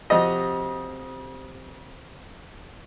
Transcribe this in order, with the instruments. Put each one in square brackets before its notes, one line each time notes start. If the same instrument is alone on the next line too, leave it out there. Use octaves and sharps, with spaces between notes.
[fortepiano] F2 D#5 [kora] C3 F#4 G4